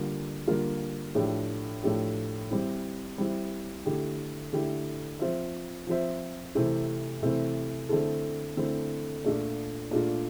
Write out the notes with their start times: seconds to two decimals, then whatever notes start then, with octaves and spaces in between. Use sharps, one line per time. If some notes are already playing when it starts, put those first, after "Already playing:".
Already playing: D3 G3 A#3 F4
0.47 D3 G3 A#3 F4
1.15 A2 F3 A3 D4 G4
1.83 A2 F3 A3 D4 G4
2.51 G3 C4 E4
3.18 G3 C4 E4
3.86 D3 A3 E4 G4
4.53 D3 A3 E4 G4
5.19 F3 C4 F4 C5 E5
5.87 F3 C4 F4 C5 E5
6.55 C3 E3 A3 C4 E4
7.23 C3 E3 A3 C4 E4
7.89 D3 A3 C4 E4 A4
8.57 D3 A3 C4 E4 A4
9.24 A#2 A3 D4 F4
9.91 A#2 A3 D4 F4